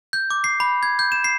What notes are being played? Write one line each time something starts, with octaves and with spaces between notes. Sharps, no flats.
G6
D6
C7
B5
G#6
G6
E7
C7